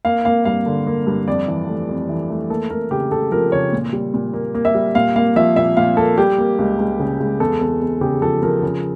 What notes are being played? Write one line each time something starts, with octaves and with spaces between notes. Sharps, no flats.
A#3 F5
A#3 F5
G2 F5
D3
A#3
G2
F2 D5
E3
A3
F2
E3
A3
A#3 A4
A#3 A#4
C#3 G4
C#3 A4
F3 A#4
C#3 C#5
A#2
G3
A#2
A#3
A#3
E5
G3
A#2 F5
A#3 F5
F3 E5
A#2 E5
A#2 F5
A#3 A4
G3 G4
A#3
C#2
C#2
C#3
C#2
E2 A4
E2
E2
C#3 G4
F3 A4
F3 A#4
C#3